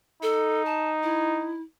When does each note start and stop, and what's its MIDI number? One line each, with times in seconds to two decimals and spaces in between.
0.23 1.61 63
0.23 0.65 69
0.65 0.90 81
1.03 1.62 64